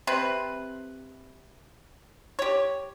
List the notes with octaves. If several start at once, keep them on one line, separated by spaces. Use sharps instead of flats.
C3 C4 B4
G4 C#5